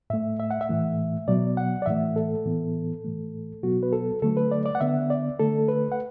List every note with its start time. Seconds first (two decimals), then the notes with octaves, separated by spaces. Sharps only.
0.10 A2 A3 E5
0.40 E5
0.51 F#5
0.61 E5
0.69 A2 E3 A3
1.28 B2 F#3 B3 D5
1.57 F#5
1.82 D5
1.86 A2 E3 A3 E5
2.16 A4
2.45 A2 E3 B3
3.04 A2 E3 A3
3.63 B2 F#3 B3 F#4
3.83 B4
3.93 A4
4.22 D3 F#3 A3 A4
4.37 B4
4.52 D5
4.66 D5
4.75 F#5
4.81 D3 B3 E5
5.10 D5
5.40 D3 A3 A4
5.68 B4
5.92 F#5